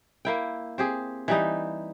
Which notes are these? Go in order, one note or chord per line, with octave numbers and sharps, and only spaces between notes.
A#3 E4 G5
C4 G4 G#4
E3 G3 D#4